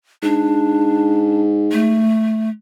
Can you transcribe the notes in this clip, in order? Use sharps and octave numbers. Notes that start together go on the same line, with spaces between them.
G#2 D4
A3